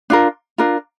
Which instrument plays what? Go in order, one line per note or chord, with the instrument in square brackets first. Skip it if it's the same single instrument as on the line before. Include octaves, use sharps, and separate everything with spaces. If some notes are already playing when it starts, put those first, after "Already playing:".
[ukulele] D4 F4 A#4
D4 F4 A#4